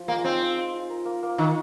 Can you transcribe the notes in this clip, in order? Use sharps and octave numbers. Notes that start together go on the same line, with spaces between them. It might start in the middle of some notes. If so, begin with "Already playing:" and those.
Already playing: F3
G#3 A#3
C4 D#4
F4
F4
F4
A#4
A#3
A#3
D#3 D#4